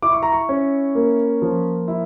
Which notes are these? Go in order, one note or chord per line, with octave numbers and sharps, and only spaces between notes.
E4 D6
C#6
A#5
C#6
C#4
A#3
F3
E4